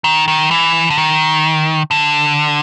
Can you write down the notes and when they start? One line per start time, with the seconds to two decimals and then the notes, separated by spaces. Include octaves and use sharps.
0.04 D#3
0.28 D#3
0.51 E3
0.90 D3
0.98 D#3
1.91 D3